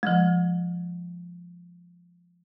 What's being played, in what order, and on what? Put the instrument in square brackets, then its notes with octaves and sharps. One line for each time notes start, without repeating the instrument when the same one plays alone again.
[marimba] F3 G#3